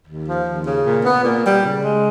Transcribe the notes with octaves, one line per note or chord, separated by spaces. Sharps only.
D#2
F3
D#2
C#3
A#2
B3
A#2
G3
C#3
G#3